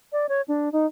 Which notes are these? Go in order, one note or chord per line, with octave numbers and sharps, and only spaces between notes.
D5
C#5
D4
D#4